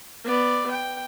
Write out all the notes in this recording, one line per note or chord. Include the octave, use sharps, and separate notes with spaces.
B3 D5
G5